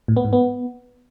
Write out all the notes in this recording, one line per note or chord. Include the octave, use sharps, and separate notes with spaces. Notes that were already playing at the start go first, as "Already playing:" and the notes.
A2
B3
G#2
B3